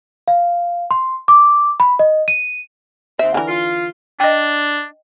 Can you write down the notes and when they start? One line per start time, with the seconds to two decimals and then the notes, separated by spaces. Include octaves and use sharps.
0.28 F5
0.91 C6
1.28 D6
1.80 B5
1.99 D#5
2.28 D#7
3.19 D#2 C4 E5
3.34 D3 E3 A#4
3.47 F4
4.20 D4 D#5 G5